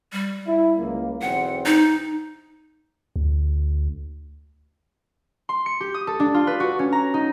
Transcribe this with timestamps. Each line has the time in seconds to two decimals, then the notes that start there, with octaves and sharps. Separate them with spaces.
0.13 G3
0.47 E4
0.78 C#2 A#3
1.22 B1 E2 C4 F#5
1.66 D#4
3.16 D2
5.49 C6
5.66 C#7
5.81 G4
5.94 D#6
6.07 A4
6.20 D4
6.34 F4
6.47 B4
6.60 F#4
6.79 C#4
6.92 A#5
7.14 D#4